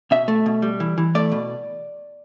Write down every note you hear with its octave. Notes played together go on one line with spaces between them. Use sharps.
B2 E5
A3
B2
G3
E3
E3
A3 D5
B2